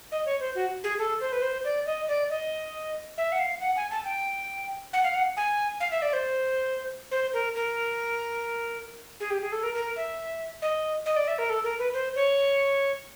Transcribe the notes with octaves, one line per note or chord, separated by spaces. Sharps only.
D#5
C#5
C5
F#4
G#4
A4
C5
B4
C5
D5
D#5
D5
D#5
E5
F#5
F5
F#5
G#5
A5
G5
F#5
F5
F#5
G#5
F5
E5
D5
C5
C5
A#4
A#4
G#4
G4
G#4
A4
A#4
A#4
E5
D#5
D#5
D5
E5
A#4
A4
A#4
B4
C5
C#5